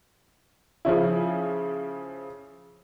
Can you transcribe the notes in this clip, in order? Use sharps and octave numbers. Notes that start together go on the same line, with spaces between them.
C#3 F3 C#4 E4